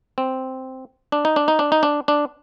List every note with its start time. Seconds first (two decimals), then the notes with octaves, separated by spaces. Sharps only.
0.18 C4
1.12 D4
1.25 D#4
1.36 D4
1.48 D#4
1.59 D4
1.72 D#4
1.83 D4
2.08 D4